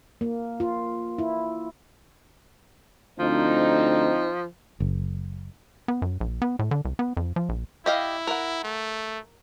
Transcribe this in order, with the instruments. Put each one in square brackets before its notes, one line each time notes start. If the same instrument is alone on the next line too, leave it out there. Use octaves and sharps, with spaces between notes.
[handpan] A#3
F4
E4
[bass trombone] D2 [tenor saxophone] F3 [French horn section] C4 D#4
[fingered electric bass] F#1
[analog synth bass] B3
F#2
A#1
B3
A2
D3
C2
B3
F2
F3
A#1
[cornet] E4 [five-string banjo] G4 D#5 F5
[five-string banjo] A#4 F#5
[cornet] A3